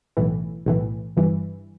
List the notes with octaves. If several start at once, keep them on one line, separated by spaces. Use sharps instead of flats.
B1 A2 E3
B1 A2 E3
G1 G2 E3